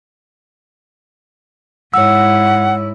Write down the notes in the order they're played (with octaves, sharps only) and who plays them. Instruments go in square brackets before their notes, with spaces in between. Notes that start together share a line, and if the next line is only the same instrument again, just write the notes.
[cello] G#2 E4 [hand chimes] C#5 E6 [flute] F#5